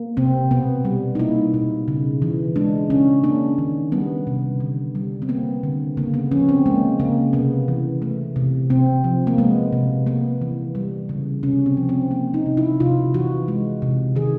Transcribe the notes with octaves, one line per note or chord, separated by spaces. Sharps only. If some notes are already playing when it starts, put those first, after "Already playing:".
Already playing: A#3
C3 C4
B2 B3
G3
D#4
A#3 E4
B2
C#3
E3
G#3 D4
C#3 C#4
A#3 D4
D#3
G3 B3
C3
D3
G3
C4
A#3 B3
D3
C#3 A#3
B3
F3 C#4
C4
G#3 A#3
C#3 A#3
C3 B3
E3
A3
C3
C3 C4
F3
A#3
G#3 B3
C3
A#3 B3
E3
G3
C#3
C3 C#4
C4
F3
C4
A#3
D#4
C3
E4
C3 F4
E3 F#4
G#3
C3
D#3 G#4